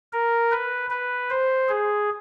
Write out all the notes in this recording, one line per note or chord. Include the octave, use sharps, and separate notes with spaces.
A#4
B4
B4
C5
G#4